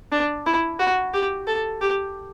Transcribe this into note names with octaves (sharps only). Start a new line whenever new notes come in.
D4
E4
F#4
G4
A4
G4